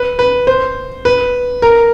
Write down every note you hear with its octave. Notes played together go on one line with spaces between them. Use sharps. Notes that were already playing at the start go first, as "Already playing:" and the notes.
Already playing: B4
B4
C5
B4
A#4